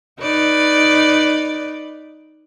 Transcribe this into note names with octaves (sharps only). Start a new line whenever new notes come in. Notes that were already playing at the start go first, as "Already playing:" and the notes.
D#4 B4 D5